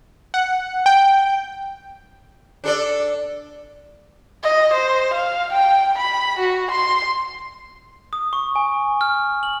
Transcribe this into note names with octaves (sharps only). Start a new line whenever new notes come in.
F#5
G5
D4 A4 D5
D#5
C5
F5
G5
B5
F#4
C6
D#6
C#6
G#5
F6
F#7